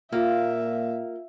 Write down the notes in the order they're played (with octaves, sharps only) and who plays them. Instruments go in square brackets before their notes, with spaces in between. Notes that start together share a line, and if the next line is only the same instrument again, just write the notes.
[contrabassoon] A#2 [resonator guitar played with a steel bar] A#3 [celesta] F4 F5 [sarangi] E5